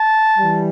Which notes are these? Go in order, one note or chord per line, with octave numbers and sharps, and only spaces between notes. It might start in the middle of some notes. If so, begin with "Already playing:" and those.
Already playing: A5
E3 G3